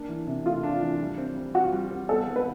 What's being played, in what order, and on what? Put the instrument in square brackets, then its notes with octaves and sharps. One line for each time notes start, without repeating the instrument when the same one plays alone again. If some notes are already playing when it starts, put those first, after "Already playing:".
Already playing: [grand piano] A#3 D4
E3
C3
[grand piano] A3 [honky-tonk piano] F4
[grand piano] D4
E3
G3
C4
G3
[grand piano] F4 [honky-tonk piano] F#4
[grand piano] G3
C4
[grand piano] B3 [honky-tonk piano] A4
[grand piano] D#3
[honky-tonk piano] B4